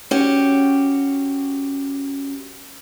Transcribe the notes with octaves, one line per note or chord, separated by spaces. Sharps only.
C#4 F#4 G4